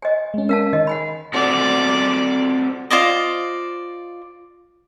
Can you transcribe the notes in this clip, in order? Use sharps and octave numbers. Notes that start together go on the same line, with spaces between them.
D#5 G#5
G#3 C#4
C#4 A#4 F5 A5
D#3 D#5
F#5 G#5 B5
C4 F#4 A4 D5
F4 C5 D5 D#5